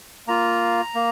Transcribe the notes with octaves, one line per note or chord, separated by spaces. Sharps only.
A#3 F4 A#5
A#3